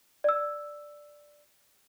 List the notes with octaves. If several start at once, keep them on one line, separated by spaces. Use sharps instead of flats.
D5 E6